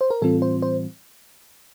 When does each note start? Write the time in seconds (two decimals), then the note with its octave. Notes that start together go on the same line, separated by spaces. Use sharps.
0.01 C5
0.11 A#4
0.22 A2 E3 G3 C4 F4 A4
0.42 C5
0.62 C5